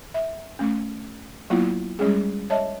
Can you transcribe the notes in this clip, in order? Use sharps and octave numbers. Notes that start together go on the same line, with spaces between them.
E5
A3 C#4
F#3 A#3 B3 E4 F4
G3 G#3 C#4 G#4
C#5 D#5 E5 A5